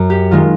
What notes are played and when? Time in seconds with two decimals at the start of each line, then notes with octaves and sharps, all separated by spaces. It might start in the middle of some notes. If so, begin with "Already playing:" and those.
Already playing: F#2
0.10 G4
0.31 D#3 G#3 F4